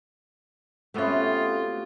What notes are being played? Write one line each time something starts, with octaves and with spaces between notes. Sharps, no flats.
C3 A3 B3 C#4 F4 F#4